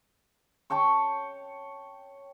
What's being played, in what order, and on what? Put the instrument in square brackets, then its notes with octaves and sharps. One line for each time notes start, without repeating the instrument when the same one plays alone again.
[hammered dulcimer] C#5 G5 A5 C#6